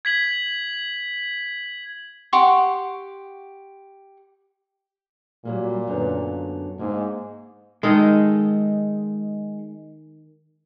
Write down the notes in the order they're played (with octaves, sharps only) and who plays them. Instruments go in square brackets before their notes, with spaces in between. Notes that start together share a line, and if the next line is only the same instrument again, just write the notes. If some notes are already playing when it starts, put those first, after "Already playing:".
[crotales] G#6 B6 F#7
[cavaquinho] G4 F#5 C6 C#6
[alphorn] A#2 [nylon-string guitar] F#3 G3 A#3
[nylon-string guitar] F#2 D3 B3
[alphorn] G#2 [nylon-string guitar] A#3 G#5
[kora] D#3 D#4 A4 [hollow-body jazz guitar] G#3